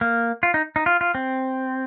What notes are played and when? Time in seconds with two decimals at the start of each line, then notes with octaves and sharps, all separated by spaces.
0.01 A#3
0.43 F4
0.54 D#4
0.76 D#4
0.86 F4
1.01 F4
1.15 C4